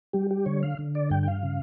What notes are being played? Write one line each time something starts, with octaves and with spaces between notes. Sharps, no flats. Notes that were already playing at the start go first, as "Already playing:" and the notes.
G3 G4
G4
D3 C#5
F5
D3
D5
G2 G5
G5
F5
C#3